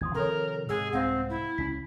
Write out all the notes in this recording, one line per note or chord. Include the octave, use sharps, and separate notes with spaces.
G#1 E2 F3 C6 D#6 G#6
C3 D#3 F3 A4 A#4 C#5
G#2 C3 G#4 E6
C2 G#2 C4 C5 F5 F#5
E4
C#2 C#4 B6